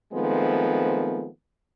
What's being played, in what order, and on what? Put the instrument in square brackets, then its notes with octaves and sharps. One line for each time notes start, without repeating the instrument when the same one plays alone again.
[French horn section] D#3 F3 G#3 A3 B3 C4